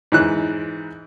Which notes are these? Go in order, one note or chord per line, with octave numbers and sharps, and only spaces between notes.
G#2 E3 F#6